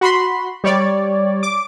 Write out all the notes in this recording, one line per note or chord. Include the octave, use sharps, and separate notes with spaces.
F#4 B5 C6
G3 C#5 D5
D6